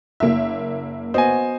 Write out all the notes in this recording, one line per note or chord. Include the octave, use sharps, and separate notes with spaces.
F#1 A#3 E5
B3 F#4 C5 D#5 G#5